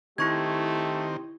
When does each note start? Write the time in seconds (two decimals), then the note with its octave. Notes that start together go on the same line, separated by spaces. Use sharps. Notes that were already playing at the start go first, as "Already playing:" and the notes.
0.18 D#3 A3 C4 E4 G4 C#6 G#6